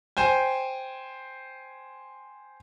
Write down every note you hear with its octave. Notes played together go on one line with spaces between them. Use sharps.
C5 G5 G#5